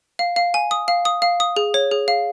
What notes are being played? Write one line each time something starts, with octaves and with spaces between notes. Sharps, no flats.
F5
F5
G#5
D#6
F5
D#6
F5
D#6
G#4
C#5
G#4
F5